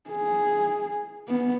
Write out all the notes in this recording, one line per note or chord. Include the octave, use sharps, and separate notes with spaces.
G#4
B3